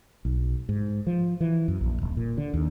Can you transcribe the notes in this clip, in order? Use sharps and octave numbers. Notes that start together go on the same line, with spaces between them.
B1
G#2
F3
E3
F#2
A#1
D#1
A#2
D3
D#2